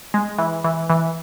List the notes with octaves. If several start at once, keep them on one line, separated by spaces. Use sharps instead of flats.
G#3
E3
E3
E3